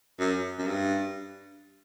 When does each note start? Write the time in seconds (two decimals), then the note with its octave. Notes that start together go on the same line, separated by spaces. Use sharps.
0.19 F#2
0.59 F#2
0.67 G2